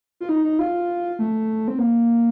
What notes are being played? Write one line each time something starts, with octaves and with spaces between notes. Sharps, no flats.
F4
D#4
D#4
F4
A3
C4
A#3